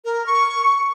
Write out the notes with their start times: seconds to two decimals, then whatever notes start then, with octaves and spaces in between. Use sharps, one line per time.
0.05 A#4
0.26 C#6